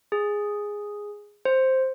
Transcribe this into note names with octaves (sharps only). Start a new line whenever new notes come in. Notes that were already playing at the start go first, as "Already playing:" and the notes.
G#4
C5